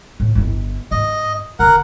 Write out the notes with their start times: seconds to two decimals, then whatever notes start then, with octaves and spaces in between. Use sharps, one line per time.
0.20 A2
0.35 G1 E4
0.91 G#2 D#5
1.59 E1 D3 A#4 F#5